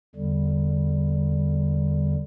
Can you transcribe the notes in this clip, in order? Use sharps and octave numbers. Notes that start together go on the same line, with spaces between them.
E2 D3 G3